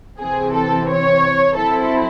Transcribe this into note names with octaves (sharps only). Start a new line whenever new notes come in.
C3 E3 C4 G#4
A4
C#5
F#3 C4 E4 A4